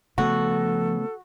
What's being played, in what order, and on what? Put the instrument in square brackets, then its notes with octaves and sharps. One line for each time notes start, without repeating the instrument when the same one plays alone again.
[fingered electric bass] C#3 A3 B3 [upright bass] F3 [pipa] F#4 [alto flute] A4